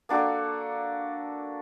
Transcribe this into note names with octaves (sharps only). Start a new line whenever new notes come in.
A#3 D4 F#4 A4